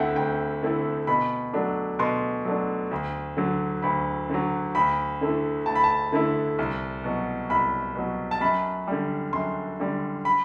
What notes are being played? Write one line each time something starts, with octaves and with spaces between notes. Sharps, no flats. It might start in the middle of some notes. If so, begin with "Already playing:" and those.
Already playing: D2 D3 A3 C4 E4 E5 F#5 G5
D2 G5
D3 A3 C4 E4
B2 B5
F#3 A3 D4
B2 C6
F#3 A3 D4
D2
D3 F#3
D2 B5
D3 F#3
D2 B5
D3 A3 E4
D2 A5
B5
A5
D3 A3 E4
C2
B2 F#3
C2 B5
B2 F#3
A5
F#2 B5
D3 G3
F#2 C6
D3 G3
B5